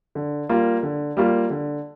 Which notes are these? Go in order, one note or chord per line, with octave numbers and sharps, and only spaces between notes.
D3
G3 A#3 F4
D3
G3 A#3 F4
D3